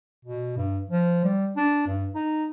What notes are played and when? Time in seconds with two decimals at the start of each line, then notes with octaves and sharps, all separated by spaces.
0.25 B2
0.57 G2
0.90 F3
1.25 G3
1.56 D4
1.87 G2
2.15 D#4